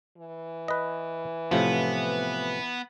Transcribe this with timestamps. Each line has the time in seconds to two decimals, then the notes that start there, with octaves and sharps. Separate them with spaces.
0.18 E3
0.68 B4 D#5
1.51 A2 C3 F3 B3